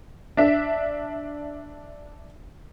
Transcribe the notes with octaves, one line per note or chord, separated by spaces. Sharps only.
D4 E5